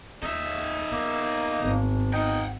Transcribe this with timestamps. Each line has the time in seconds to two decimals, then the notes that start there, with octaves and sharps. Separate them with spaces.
0.23 D#2 D#4 E5
0.92 E2 A#3
1.59 G#1
2.13 D#4 F#5 G5